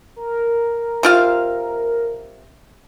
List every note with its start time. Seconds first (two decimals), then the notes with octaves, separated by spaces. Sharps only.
0.16 A#4
1.03 C3 F4 F5